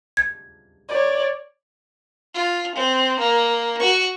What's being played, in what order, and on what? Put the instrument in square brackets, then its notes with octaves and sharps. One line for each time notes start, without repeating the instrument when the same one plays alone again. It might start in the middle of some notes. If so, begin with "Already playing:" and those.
[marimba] G#6
[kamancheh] C#5 D5
[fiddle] F4
C4
A#3
F#4 C#6